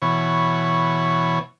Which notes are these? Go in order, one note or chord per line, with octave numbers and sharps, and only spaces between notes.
B2 E3 C#5